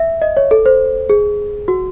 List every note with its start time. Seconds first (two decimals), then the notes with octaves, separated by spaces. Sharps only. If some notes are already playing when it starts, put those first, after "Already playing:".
Already playing: E5
0.22 D#5
0.37 C#5
0.51 A4
0.66 C5
1.09 G#4
1.68 F#4